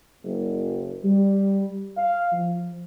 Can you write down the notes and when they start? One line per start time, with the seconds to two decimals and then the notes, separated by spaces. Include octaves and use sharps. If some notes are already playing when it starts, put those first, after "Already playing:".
0.24 F#1
1.04 G3
1.97 F5
2.33 F3